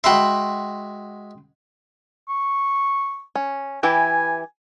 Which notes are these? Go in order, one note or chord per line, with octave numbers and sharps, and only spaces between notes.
G#3 F#4 E5 G5 B5 C6
C#6
C#4
E3 E4 G4 G#5